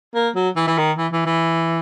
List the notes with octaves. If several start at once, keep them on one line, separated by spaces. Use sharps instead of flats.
A#3
F#3
E3
E3
D#3
E3
E3
E3